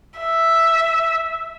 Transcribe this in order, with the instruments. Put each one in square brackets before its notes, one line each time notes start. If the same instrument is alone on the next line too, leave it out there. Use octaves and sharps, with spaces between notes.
[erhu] E5